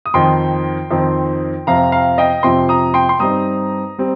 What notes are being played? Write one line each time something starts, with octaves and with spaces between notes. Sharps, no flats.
D#6
F2 D#3 C4 D#4 G5 C6
F2 D#3 C4 D#4
F2 C3 F3 C4 F5 A#5
F5 A#5
D#5 G5
F2 C3 F3 C4 G5 C6
A#5 D#6
G5 C6
C6
G2 G3 C4 D#4 A#5 D#6
G3 C4